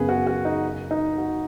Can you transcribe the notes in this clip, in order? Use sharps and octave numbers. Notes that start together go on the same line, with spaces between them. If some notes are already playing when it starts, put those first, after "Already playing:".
Already playing: F#2 C#3 B3 G#4 B4
F#4
F#4
D#4
D#4
F#4